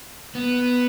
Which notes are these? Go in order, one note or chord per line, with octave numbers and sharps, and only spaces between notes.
B3